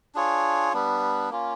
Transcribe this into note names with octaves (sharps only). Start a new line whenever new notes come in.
D4 F4 G#4 C#5
G3 B3 D4
A#3 C#4 F4